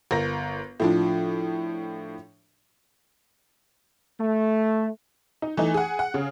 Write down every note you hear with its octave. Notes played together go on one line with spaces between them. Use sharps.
G1 A#4 A#6
A2 F3 D4
A3
D#4
E3 A3 D#4
G#4 F#5
F#5
C#3